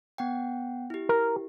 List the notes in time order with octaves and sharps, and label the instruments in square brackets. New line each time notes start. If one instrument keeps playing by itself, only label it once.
[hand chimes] B3 F#5 G5
E4 G4
[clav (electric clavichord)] A#4